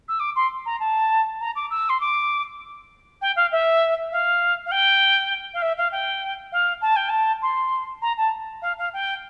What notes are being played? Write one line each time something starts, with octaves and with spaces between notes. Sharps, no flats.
E6
D6
C6
A#5
A5
A#5
D6
E6
C6
D6
G5
F5
E5
F5
F5
G5
F5
E5
F5
G5
F5
A5
G5
A5
C6
A#5
A5
F5
F5
G5